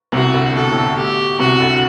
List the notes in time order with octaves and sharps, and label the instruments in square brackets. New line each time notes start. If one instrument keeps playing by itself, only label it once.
[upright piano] C2 C3 [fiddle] F#4
[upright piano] D2 D3
[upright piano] B2 [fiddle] A4
[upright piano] A2
B2
[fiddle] G4
[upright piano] C2 C3 [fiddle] F#4
[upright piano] D2 D3